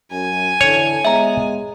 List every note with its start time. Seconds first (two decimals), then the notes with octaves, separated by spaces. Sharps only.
0.12 F#2 G#5
0.61 D3 E3 C#5
1.05 G#3 B3 E5 A#5